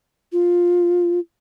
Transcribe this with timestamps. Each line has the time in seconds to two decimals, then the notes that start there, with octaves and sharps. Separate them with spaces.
0.33 F4